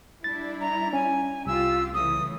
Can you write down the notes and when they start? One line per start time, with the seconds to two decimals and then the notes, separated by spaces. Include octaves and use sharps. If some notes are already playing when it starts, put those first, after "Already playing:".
0.24 G3 D4 E4 A6
0.60 A#5
0.93 C#4 G#5
1.46 C2 F4 G4 E6
1.94 C#3 E3 A3 D#6